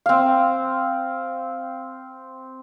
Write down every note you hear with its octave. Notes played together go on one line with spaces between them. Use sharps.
C4 F5